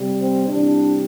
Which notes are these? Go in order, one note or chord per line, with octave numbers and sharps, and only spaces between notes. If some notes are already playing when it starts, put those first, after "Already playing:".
Already playing: C3 G3
C4
C3 E3 G3 D4